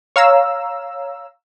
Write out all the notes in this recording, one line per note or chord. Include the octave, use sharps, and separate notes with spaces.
C#5 F5 A#5 E6